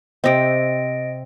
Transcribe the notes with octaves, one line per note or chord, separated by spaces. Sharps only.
C3 C4 D#5 A#6 D7